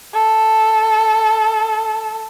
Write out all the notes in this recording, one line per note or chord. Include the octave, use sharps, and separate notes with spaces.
A4